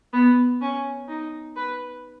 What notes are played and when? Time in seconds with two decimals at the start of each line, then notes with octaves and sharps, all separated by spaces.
0.13 B3
0.61 C#4
1.08 D#4
1.56 B4